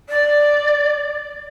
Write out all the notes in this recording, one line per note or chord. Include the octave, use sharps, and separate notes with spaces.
D5